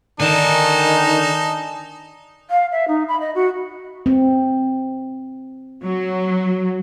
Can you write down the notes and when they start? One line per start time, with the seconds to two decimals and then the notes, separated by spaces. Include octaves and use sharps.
0.20 D3 D#3 D#4 G#5 A5
2.50 F5
2.72 E5
2.88 D#4
3.08 B5
3.20 D#5
3.35 F#4
4.06 C4
5.84 F#3